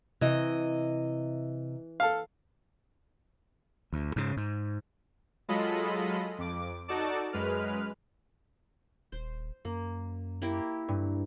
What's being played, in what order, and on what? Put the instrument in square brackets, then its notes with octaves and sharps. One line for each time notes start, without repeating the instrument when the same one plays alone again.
[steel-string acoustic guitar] C3 D#5 [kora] E3
[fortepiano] A4 F5
[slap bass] D2
G#2 C#3
G#2
[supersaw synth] F#3 G#3 F4 A4 D#5 B5
F2 D6
D#4 F#4 A4 D5 A5 D6
F#2 G#3 B4 F6
[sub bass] D#1 [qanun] C5
[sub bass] F#2 [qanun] A#3
[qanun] A#3 E4 G4
[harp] G2